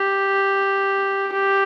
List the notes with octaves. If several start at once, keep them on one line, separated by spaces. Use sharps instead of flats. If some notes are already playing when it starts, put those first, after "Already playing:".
Already playing: G4
G4